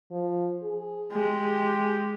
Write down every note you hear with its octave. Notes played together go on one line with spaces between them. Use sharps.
F3
G#4
G#3 G4